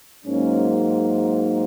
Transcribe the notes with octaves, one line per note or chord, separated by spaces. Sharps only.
G#2 F#3 A#3 C#4